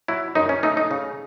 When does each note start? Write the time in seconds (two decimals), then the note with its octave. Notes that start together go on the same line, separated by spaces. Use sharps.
0.08 F#3 E4
0.35 F#2 D#4
0.49 C#4
0.63 A3 D#4
0.77 D#4
0.91 C#3